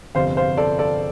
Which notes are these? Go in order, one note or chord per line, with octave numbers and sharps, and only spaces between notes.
G1 F2 C3 C5 F5
C5 F5
A4 D5
A4 D5